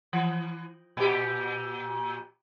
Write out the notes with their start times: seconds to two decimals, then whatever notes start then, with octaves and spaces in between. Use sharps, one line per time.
0.13 E3
0.97 A#2 G4